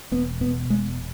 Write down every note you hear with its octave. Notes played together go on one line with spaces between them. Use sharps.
E1 B3
B2 B3
E1 G#3